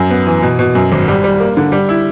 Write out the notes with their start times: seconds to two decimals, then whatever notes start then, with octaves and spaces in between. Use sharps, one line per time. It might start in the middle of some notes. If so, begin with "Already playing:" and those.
Already playing: F#2
0.10 B3
0.26 E3
0.42 B2
0.59 B2
0.75 F#2
0.92 G#1
1.08 G3
1.24 G3
1.40 A#3
1.57 D3
1.72 G3
1.89 E4